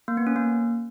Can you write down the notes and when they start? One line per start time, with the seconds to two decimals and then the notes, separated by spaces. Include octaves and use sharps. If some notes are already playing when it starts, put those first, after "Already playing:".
0.08 A#3
0.17 B3
0.27 C#4
0.36 A#3